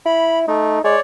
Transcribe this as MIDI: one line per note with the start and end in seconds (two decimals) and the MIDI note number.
0.06 0.44 64
0.06 0.39 83
0.48 0.79 57
0.48 0.82 63
0.84 0.97 56
0.84 1.00 73
0.84 1.00 74